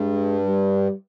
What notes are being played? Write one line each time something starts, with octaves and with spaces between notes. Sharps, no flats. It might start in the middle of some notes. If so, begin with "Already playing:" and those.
Already playing: G2 G#3
G3